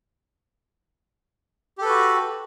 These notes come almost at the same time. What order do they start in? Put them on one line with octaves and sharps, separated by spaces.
G4 A4 B4 F#4